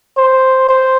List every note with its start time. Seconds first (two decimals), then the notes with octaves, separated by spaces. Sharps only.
0.17 C5
0.69 C5